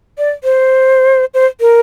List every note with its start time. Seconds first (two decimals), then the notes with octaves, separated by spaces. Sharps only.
0.18 D5
0.44 C5
1.34 C5
1.61 A#4